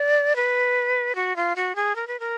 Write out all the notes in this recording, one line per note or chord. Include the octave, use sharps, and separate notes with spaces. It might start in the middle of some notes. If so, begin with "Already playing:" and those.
Already playing: D5
B4
F#4
F4
F#4
G#4
A#4
B4
A#4